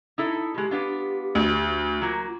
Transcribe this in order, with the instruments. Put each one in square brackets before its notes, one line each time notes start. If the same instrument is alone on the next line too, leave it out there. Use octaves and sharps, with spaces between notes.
[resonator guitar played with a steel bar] D#4 E4 A4
[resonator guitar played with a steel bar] B2 G#3 [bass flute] G4
[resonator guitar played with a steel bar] B3 D4 F4
[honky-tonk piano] D2
[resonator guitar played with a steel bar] F#3 A#3 [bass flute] F4